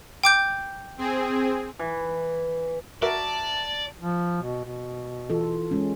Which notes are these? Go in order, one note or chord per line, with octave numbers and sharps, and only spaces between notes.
G5 D6 G6
C4 G#4
E3
F#4 A#4 D5 E5 A5
F3
B2
B2
E3 F4 A4
G#3 C#4